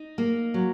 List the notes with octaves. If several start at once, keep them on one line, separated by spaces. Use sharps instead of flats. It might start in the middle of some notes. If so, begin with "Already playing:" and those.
Already playing: D#4
A#3
F#3